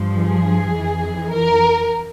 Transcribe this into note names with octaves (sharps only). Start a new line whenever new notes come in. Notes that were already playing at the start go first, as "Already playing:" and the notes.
Already playing: G2 F3
G#4
F2 E3
A#4